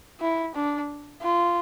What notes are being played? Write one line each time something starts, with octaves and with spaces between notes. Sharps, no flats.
E4
D4
F4